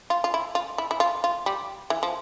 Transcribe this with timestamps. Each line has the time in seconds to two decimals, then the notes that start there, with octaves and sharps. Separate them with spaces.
0.10 F4
0.24 F4
0.34 E4
0.55 F4
0.78 E4
0.91 E4
1.00 F4
1.24 F4
1.46 G3
1.90 E3
2.03 F3